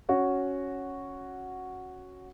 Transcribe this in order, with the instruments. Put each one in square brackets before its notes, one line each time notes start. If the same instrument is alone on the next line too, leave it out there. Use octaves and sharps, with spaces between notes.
[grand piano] C#4 F#4